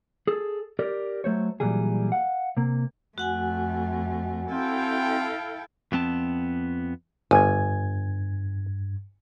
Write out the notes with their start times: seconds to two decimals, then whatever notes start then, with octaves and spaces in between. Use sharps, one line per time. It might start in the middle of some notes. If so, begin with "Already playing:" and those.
0.27 G#4 A4
0.79 G4 A#4 D5
1.24 F#3 A3 C5 C#5
1.60 A#2 E3 F#3 G3 G#4
2.12 F5 F#5
2.57 C3 A#3
3.18 F2 A3 F#4 F#5 G#5
4.51 C4 E4 A4 F5 G5
5.92 F2 B3 C4 A5
7.31 G1 G2 G#5 G#6